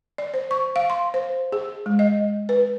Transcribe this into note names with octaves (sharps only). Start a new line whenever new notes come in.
D5
C5
C#6
F5
C6
C5
G#4
G#3
D#5
B4